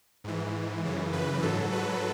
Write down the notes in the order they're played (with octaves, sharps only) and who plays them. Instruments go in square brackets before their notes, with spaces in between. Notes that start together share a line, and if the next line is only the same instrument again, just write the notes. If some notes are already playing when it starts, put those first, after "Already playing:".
[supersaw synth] G#2 E3
F#2 C#3 E3
B4
G#2 F#3 A4
B4